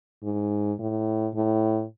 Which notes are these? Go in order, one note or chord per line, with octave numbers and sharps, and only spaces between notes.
G#2
A2
A2